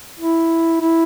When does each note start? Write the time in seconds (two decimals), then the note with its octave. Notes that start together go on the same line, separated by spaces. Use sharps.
0.19 E4
0.80 E4